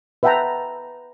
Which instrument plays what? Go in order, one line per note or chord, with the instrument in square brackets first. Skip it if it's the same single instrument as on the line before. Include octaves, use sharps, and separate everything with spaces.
[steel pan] B4 E5 F#5 G5 A5 A#5